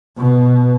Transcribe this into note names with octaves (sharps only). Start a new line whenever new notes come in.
B2